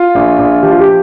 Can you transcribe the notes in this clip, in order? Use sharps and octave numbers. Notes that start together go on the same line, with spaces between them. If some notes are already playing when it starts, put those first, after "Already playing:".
Already playing: F4
A#1
A#1
F3 G4
F4
G4